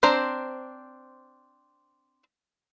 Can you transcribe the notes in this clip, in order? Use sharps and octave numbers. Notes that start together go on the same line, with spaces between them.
C4 D4 C5 A#5